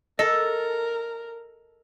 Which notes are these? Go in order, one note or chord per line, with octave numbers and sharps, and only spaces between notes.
A4 A#4 D#5